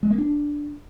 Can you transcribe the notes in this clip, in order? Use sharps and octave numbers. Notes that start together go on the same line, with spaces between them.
G#3
A#3
D4